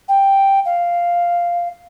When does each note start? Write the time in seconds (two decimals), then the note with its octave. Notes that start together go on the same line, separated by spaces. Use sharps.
0.08 G5
0.65 F5